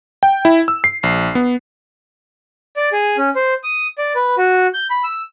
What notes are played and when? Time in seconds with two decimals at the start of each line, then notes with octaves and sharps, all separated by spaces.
0.23 G5
0.45 E4
0.68 E6
0.84 C7
1.03 A#1
1.35 B3
2.77 D5
2.93 G#4
3.17 C#4
3.36 C5
3.64 D#6
3.98 D5
4.15 B4
4.38 F#4
4.74 G6
4.90 B5
5.04 E6